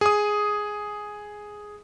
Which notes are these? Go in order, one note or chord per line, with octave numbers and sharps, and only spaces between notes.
G#4 D#6